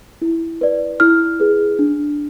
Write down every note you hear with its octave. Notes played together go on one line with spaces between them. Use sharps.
E4
B4 D5
E4 F6
G#4 B4
D4